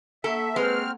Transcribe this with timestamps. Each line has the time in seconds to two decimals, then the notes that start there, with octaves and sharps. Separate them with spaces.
0.24 A#3 A4 E5 F#5 C#6
0.56 G#3 C4 B4 F6